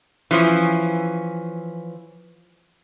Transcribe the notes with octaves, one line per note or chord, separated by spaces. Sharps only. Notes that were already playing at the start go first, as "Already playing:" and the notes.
E3 F3 C#4